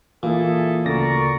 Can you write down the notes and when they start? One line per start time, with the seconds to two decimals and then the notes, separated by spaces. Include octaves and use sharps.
0.23 A#2 E3 G#4 A4 E5
0.86 D2 C#3 A#4 D5 C#6 A6 A#6